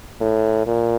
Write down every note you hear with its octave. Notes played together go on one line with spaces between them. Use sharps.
A2
A#2